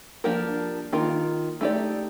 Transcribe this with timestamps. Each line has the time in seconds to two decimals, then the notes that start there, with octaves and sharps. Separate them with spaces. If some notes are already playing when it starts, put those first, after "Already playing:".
0.24 F3 A#3 D4 G4 A#4
0.93 D#3 A#3 F4 A#4
1.61 A3 D#4 G4 D5